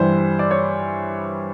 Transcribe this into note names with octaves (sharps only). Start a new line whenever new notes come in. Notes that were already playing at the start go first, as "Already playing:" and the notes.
Already playing: G2 E3 G3 C5
D5
C#5